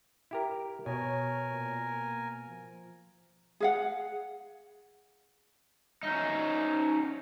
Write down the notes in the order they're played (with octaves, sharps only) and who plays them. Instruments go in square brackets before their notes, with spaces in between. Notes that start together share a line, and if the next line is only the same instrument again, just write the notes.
[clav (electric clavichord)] E4 G4 A#4
[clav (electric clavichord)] B2 [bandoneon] A#4 G#5 [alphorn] C#5
[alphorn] A#2
A#3
F3
[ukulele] G#4 F5 F#5
[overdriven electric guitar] C#4 D#4